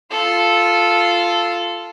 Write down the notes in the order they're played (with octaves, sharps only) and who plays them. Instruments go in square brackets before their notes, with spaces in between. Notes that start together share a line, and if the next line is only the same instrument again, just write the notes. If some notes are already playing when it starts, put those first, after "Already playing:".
[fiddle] F4 A4